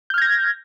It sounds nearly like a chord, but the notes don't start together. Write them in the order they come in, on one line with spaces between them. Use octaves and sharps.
G6 F6 G#6 A#6